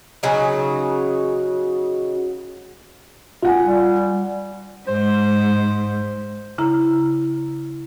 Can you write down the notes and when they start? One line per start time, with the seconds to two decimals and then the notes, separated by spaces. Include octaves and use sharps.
0.23 C#3 F#3 D#4
3.42 F4 F#5 G#5
3.64 G3
4.88 G#2 C5
6.58 C#3 E4 A#5